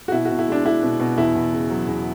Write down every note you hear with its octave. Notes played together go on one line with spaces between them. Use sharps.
F#4
B2 E4
B2 F#4
E4
G#3 D4
D4 E4
B2
B2
E2 E4
E2
C#3
F#3
E2